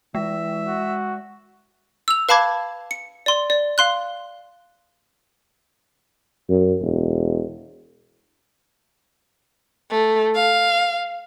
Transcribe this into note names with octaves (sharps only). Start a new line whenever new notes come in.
E3 G#3 E5
F#4
E6 F7
B4 F5 A5 B5 D6 G#6
C#7
D5 C6
D5
F5 C6 F#6
F#2
E1
A3
F5